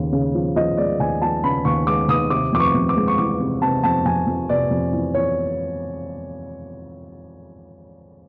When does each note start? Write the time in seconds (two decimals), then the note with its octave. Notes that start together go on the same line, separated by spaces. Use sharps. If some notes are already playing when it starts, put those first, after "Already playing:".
Already playing: D#2 C#3
0.12 C#3
0.35 F3
0.56 F3 D#5
0.77 G#3 D5
1.00 D#2 G#5
1.22 F3 A5
1.44 C#3 B5
1.65 D#2 C#6
1.87 G#3 D6
2.08 D#2 D#6
2.30 C3 D6
2.53 F2 D6
2.60 C#6
2.74 F2
2.89 D6
2.97 G#3
3.08 C#6
3.18 E3 D6
3.40 C3
3.62 C3 A5
3.83 F2 A5
4.05 F2 G#5
4.27 F2
4.49 C3 D5
4.71 F2
4.93 E3
5.14 E3 C#5